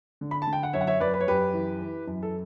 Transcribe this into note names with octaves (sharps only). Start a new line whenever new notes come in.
D3
B5
A5
D3
G5
F#5
F#2 C#5 E5
F#5
C#5 E5
F#2 B4 D5
B4
C#5
F#2 G4 B4
E3
E3
F#2
A4